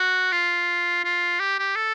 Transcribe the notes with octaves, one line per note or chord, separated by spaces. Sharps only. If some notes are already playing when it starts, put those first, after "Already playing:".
Already playing: F#4
F4
F4
G4
G4
A4